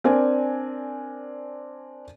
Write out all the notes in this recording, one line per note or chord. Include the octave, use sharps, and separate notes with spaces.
C4 D4 A#4 D5 G#5